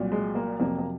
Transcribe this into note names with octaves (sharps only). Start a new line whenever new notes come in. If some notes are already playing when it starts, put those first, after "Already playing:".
Already playing: C2 A#2 F#3
G#3
A#3
F2 C3 F#3 A#3
A#3